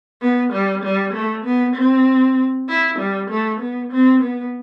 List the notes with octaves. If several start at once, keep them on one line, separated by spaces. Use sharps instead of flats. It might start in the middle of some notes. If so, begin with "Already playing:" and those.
B3
G3
G3
A3
B3
C4
E4
G3
A3
B3
C4
B3